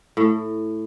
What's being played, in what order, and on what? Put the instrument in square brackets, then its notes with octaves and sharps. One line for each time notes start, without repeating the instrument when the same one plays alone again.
[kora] A2